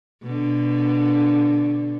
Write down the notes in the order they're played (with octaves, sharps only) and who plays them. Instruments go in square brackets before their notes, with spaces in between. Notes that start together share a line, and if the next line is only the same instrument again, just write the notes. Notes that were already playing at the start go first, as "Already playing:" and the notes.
[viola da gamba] B2 D3